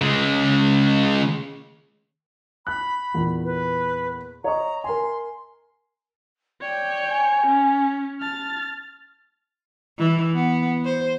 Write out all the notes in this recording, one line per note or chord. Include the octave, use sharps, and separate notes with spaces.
C#3 G#3
B5 F#6
E2 A#2
B4
C#5 D#5 A#5 C#6
A#4 G#5 C6
C#5 D5 G5
G#5
C#4
A5 F6 A6
E3
B3
C5